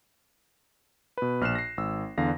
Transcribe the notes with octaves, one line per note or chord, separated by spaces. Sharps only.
B2 B4
A#1 F6 F#6 C7 E7
A#6 C7
G#1 E6
E2 D3 F5 A#6